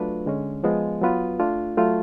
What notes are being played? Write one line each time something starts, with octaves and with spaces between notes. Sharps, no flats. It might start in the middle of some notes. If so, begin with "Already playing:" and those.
Already playing: F#3 A3 D4 F4 B4
D3 G#3 C#4
F3 G#3 B3 F4
F#3 B3 F4 B4
A3 D4 F4
F#3 A3 F4